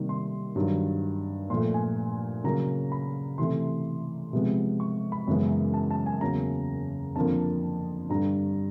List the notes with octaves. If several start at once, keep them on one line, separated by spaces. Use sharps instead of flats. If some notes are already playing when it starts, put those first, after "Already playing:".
Already playing: C3 D#3 G3 A#3
C6
G2 D#3 F#3
A#2 F3 A3 C6
G#5
C#3 F#3 A#3 A#5
B5
C3 E3 A3 C6
C3 F3 G#3 B3
C#6
B5
F#2 C#3 E3 G#3 B3
A5
A5
G#5
E2 C#3 F#3 A#3 A#5
F2 D3 F3 A#3 A5
G2 D3 G3 A#5